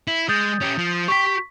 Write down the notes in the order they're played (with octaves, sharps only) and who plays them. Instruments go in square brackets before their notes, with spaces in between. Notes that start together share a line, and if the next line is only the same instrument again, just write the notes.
[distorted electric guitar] E4 [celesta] F#7
[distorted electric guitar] G#3 [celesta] D#6 G6 A6
[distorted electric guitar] C#4 G4
F3
[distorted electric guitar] G4 G5 [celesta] C#6 B6